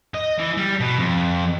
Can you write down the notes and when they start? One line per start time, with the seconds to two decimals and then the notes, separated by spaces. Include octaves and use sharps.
0.14 D#5
0.39 E3
0.57 G3
0.80 B2
0.99 F2